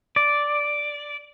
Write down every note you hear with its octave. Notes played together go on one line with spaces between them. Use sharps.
D5